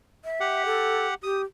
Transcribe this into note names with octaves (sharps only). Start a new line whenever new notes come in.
E5
G4 F#5
A4
G4 D#6